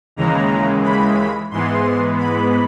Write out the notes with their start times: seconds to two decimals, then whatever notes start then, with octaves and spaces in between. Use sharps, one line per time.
0.16 D#2 C#3 E3 G#3 A#5
0.84 B5
1.51 G#2 E3 G#3 B3 C6
2.18 B5